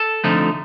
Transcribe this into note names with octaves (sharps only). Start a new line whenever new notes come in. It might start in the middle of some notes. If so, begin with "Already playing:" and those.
Already playing: A4
F2 D3 F3 A3 D#4